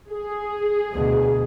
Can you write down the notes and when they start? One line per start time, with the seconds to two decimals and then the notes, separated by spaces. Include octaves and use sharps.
0.11 G#4
0.91 D2 B2